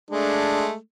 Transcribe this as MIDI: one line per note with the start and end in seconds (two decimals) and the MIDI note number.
0.10 0.75 56
0.10 0.75 57
0.10 0.67 62